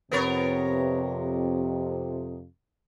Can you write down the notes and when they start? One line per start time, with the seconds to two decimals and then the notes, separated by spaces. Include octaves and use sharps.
0.11 F2 C3 B3 A#4 C#5